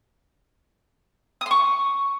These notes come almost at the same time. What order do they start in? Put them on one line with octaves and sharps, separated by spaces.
D#6 C6 C#6